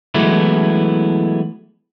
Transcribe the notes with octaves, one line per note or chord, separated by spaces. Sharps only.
E3 F#3 G#3 A3 B3 E4